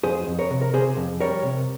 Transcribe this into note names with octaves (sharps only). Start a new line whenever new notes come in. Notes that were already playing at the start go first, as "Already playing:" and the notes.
F2 G#4 C5
F2
A#4 C#5
C3
A#4
C3 G#4 C5
F2
G3 A#4 C#5
C3